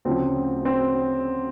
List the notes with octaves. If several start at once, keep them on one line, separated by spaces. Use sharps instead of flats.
D2 C#3 F3 C4
C4